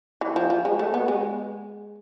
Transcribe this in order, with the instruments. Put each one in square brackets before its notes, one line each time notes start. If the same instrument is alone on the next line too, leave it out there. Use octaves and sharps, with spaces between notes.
[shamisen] E3
F3
F3
G#3
A3
B3
G#3